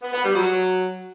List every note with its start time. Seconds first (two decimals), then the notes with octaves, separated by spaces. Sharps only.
0.02 B3
0.13 B3
0.24 G3
0.35 F#3